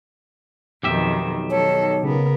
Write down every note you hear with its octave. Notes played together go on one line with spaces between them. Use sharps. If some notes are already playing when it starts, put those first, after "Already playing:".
B1 F2 B2 D#3 G4 E5
D#3 A4 C#5
C#3 B3 A#4